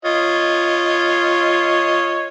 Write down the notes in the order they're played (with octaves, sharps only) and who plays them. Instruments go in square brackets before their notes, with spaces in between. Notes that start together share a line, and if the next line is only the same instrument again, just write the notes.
[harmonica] F4 C#5 D#5